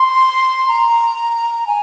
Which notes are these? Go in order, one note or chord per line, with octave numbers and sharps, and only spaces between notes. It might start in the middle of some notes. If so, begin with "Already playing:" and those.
Already playing: C6
A#5
G#5